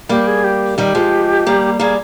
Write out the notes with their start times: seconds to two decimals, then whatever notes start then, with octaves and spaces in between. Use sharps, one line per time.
0.09 G3 A#3 G4
0.27 G#4
0.44 G4
0.78 D#3 G3 G4
0.95 F3 G#3
1.46 G3 A#3
1.80 G3 A#3 G#4